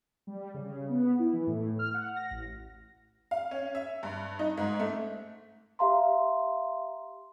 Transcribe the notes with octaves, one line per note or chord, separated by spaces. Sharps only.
G3
C#3
B3
E4
E3
A2
F6
F#5
A#6
A1
F5
C#4
E5
G2
D#4
G#2
A3
G4 E5 F5 A#5 C6